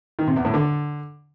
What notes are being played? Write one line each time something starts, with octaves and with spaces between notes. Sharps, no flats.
D#3
C3
E2
A2
D3